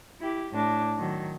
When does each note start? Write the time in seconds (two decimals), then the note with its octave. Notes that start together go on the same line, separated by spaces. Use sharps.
0.19 E4 G4
0.51 A2 D4
0.96 D#3 F#3